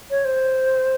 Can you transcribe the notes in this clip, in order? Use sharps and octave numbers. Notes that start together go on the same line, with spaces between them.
C#5
C5